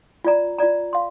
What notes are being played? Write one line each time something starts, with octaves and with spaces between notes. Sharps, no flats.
F4 D5 A#5
F4 D5 A#5
F5 C6